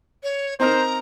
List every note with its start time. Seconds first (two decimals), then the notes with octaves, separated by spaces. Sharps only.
0.23 C#5
0.60 C4 D#4 A#4 C5 A#5